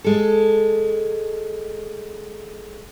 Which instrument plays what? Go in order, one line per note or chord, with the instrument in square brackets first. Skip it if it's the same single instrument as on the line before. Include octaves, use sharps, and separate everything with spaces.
[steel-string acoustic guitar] G#3 A4